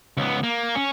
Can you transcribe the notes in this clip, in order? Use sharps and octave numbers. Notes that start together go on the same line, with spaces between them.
C#2 B3
A#3
C#4